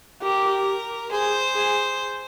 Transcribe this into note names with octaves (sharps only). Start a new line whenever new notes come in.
G4 A#4
G#4 C5
G#4